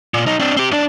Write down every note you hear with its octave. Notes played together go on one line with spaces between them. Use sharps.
A#2
B1 D#4
C4 D4
C4 G4
F#2 D4